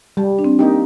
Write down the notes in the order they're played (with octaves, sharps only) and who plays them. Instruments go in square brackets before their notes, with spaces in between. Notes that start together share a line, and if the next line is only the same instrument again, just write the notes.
[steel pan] G3 [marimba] G4
[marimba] D4
C4
[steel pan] A#3 D#4 G4